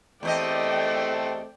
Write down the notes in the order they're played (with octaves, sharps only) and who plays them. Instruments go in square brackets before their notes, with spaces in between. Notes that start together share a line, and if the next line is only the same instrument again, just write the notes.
[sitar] E2 G4 D#5 [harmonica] A3 C4 A4 [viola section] D5 G5